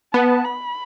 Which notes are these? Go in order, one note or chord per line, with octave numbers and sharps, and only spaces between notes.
B3 A5
B5